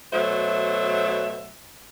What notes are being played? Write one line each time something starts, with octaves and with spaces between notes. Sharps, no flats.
B2 F#3 A3 C5 E5